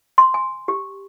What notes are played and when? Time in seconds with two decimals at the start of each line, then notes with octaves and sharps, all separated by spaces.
0.18 C6
0.34 G#5
0.68 G4